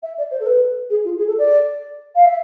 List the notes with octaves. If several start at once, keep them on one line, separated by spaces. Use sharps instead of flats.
E5
D5
C5
A4
B4
G#4
F4
G#4
A4
D5
F5
E5